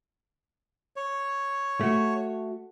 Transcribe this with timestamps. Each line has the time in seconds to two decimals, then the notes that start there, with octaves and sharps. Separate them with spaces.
0.96 C#5
1.81 A3 F#4